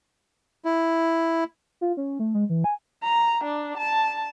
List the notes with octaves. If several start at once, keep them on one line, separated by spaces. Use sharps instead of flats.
E4
F4
C#4
A3
G#3
E3
G#5
A#5
D4
A5